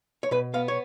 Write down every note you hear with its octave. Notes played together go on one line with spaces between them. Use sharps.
C#5
B2 B4
B3 F5
C#5